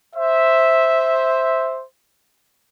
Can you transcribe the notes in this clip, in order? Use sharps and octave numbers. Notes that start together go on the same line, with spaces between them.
C5 E5